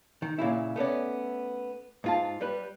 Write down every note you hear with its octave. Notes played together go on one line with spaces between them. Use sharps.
D#3
A#2 C#3 E4
A3 B3 C#4 D5
G#2 F4 A5
G3 B4